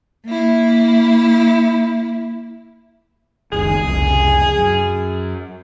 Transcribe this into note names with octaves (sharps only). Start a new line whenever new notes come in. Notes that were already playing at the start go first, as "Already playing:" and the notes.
A#3 E4
F#1 C#2 D#3 G#4
C2 F2 C#3
F#2